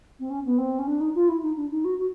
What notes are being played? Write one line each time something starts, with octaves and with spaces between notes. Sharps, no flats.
C4
C#4
B3
C4
C#4
D4
D#4
F4
E4
D#4
D4
D#4
F#4
F#4